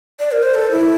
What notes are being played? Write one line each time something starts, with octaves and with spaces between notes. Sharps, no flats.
D5
A#4
C5
A4
E4